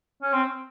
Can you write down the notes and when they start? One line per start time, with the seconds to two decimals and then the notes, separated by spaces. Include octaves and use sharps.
0.22 C#4
0.33 C4